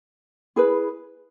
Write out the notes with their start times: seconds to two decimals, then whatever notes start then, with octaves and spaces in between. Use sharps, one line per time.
0.56 E4 G#4 B4